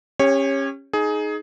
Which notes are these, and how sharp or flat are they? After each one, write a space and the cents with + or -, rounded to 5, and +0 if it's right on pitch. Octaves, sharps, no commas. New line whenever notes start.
C#4 -20 G4 +30 C#5 -10
D#4 +0 G#4 +20